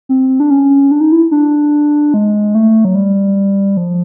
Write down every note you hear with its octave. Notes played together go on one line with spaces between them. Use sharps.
C4
D4
C#4
D4
D#4
E4
D4
G#3
A3
F#3
G3
F3